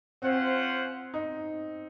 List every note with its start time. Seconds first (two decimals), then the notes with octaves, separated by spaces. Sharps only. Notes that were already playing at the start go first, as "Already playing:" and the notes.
0.22 C4 C#4 F4 C5 F#5
1.14 D#4